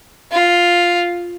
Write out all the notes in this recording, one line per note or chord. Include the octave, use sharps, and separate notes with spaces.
F4